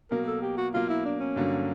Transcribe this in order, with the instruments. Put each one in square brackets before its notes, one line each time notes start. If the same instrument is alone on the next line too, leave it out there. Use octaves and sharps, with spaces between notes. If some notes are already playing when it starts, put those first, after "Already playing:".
[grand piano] B2 F#3 A#3 [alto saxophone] A#4
[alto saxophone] A4
G4
F#4
[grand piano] B2 F#3 A#3 [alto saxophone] F4
[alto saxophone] E4
D4
C#4
[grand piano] G2 D3 F#3 A#3